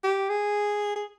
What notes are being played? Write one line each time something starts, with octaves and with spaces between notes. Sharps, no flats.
G4
G#4
G#4